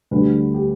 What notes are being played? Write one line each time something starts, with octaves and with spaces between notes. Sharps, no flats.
D2 D3 G3 B4
G4